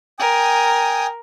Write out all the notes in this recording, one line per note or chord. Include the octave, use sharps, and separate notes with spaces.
A#4 G5 G#5 D#6